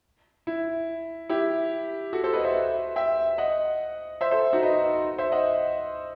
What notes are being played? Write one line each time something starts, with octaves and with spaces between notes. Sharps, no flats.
E4
E4 G4
F#4 A4
A4 C5
B4 D#5
C5 E5
E5 G5
D#5 F#5
C5 E5
A4 C5
D#4 F#4
B4 D#5
C5 E5
D#5 F#5